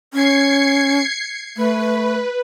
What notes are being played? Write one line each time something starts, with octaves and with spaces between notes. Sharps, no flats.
C#4 G#6 C7 C#7
A3 B4